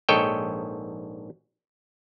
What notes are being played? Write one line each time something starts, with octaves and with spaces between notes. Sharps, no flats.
A#1 G#2 A4 C#5 D#5 G5